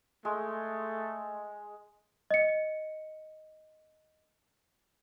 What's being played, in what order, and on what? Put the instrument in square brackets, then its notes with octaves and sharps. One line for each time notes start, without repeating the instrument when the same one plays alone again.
[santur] G#3 [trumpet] A3
[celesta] D#5 C#7